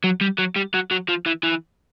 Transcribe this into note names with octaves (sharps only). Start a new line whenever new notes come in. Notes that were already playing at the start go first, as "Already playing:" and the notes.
F#3
G3
F#3
G3
F#3
F#3
F3
E3
E3